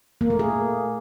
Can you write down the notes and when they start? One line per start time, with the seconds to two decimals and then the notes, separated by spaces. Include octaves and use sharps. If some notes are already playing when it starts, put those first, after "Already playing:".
0.21 A#3
0.30 A3
0.39 G#4